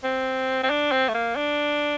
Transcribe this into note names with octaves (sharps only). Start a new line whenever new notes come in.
C4
C4
D4
C4
A3
A#3
D4